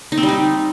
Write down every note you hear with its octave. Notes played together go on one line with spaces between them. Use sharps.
D#4
C4
G3
D#4